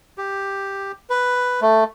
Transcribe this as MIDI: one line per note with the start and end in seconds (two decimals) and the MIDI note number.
0.18 0.92 67
1.10 1.60 71
1.61 1.84 57